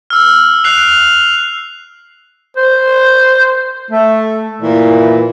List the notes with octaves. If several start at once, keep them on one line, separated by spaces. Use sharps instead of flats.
E6 F6
F#6 C7 F7
F7
C5
A3
A#2 E3